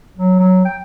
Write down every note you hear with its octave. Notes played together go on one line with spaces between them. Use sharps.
F#3
F#3
G5